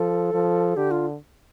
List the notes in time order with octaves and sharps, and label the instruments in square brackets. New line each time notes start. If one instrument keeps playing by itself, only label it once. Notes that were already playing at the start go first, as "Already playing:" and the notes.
Already playing: [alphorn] F3 [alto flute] A4
[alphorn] F3
[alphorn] D3 [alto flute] G4
[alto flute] F4